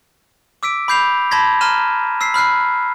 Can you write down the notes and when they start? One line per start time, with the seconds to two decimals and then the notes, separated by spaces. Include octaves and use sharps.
0.63 D6 E6 B6 D7
0.88 B5 D6 G6 C7 F7
1.31 A5 B5 C6 G#6 A#6 B6
1.61 A#5 C6 F6 D#7 E7
2.21 E6 B6 C7
2.34 B5 F6 F#6 C7